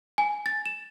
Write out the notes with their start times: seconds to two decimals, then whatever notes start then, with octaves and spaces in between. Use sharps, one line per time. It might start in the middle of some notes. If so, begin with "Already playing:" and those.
0.18 G#5
0.46 A6
0.66 E7